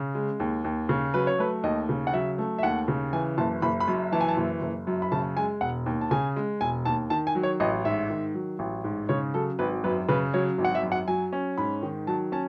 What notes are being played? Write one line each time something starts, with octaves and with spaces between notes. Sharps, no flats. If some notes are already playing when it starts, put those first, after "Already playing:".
Already playing: C#3
G#3
D#2
D#2
C#3
F#3 B4
C#5
A3 B4
D#2 D#5
C#3
F#5
F#3 E5
A3
E5
D#2 F#5
C#3
E3 G#5
F#1 A5
F#1 B5
B5
F#2
E3 A5
G#5
A5
F#1
F#1
F#2
B5
C#3 A5
G#3 G#5
E1 F#5
D#2
A5
C#3 G#5
G#3
E1 G#5
D#2 A5
D#3 A5
G#5
F#3
C#5
A1 D#5
G#2 E5
D#3
F#3
A1
G#2
C#3 C#5
F#3 A4
G#1 B4
F#2 B4
C#3 B4
F#3 C#5
G#1
F#5
E5
F#2
F#5
F#3 G#5
C#4
G#2 B5
D#3
F#3 A5
C#4 A5